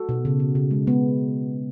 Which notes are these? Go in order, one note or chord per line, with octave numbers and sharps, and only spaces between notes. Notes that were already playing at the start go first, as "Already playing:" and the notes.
Already playing: F#4 A4
B2
C#3
C#3
C#3
G#3
G#3 B3